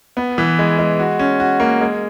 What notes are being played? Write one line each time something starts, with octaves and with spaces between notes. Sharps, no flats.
B3
E3
G#3
G#3
F#4
C#4
F#4
A#3
G#3